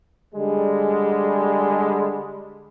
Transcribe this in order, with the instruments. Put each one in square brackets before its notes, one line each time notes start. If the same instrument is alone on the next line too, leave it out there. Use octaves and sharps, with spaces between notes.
[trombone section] D3 G3 G#3